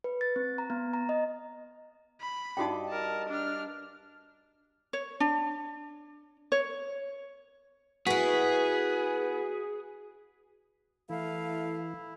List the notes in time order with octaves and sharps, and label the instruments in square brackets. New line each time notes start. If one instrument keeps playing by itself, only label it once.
[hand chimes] B4
A6
C4
A#5
B3
A#5
D#5
[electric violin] B5
[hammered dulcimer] G2 D#5 D6 [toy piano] D#4 F#4 G5
[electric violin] A#4 A5
D4 F6
[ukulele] C#5
D4
C#5
[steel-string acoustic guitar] B3 E4 [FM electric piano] F#4 B6 [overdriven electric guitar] G#4 [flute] B4
[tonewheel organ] E3 [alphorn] A3 [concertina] E4 [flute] F5